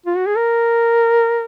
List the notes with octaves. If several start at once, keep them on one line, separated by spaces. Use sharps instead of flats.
F4
F#4
G#4
A#4